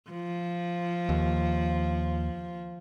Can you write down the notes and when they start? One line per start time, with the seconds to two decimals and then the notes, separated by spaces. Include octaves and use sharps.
0.11 F3
1.09 D#2